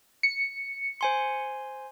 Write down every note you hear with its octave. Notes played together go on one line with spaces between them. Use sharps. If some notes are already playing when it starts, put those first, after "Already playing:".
C#7
C5 G#5 C6